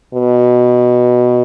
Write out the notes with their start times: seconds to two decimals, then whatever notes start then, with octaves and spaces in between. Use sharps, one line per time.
0.14 B2